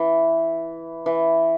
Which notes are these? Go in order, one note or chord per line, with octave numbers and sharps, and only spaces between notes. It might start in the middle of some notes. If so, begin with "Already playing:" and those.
Already playing: E3
E3